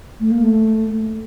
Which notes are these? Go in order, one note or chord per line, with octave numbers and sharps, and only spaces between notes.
A3
A#3
A3